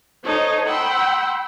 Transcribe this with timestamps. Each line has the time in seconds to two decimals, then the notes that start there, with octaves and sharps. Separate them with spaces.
0.25 D#4 A4 C5 C#5 D#5
0.65 F#5 G5 B5 C6 E6